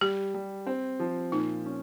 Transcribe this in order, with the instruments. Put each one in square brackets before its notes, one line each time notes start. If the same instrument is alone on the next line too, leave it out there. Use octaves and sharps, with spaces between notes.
[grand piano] G3 [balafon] G4
[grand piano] G3
C4
F3
[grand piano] A#2 [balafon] D#4
[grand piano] C#4